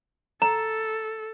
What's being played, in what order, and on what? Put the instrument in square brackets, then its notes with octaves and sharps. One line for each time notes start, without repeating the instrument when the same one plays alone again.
[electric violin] A4 [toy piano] A#5